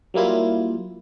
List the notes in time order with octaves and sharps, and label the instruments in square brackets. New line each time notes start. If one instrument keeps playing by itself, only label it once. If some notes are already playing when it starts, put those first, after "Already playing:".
[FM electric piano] F#3 G3 A#3 E4 F4